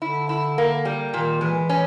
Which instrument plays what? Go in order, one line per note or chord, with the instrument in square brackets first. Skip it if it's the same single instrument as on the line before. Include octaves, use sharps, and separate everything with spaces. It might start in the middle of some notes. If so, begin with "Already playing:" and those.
[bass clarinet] D3 [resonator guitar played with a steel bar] E4
[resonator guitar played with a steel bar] E4
A#3
G3
[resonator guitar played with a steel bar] A#2 [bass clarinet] D#3
[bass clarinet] E3 [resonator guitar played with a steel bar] G#3
[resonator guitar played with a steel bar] C#4